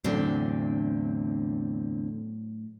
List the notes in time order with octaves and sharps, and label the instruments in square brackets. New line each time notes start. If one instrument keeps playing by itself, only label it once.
[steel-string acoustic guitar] E2 D3 C4 [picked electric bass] A2 F#3